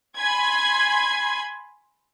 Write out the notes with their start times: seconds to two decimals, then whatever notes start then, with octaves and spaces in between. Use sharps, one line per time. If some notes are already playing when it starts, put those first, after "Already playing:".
0.16 G#5 B5 C6 G#6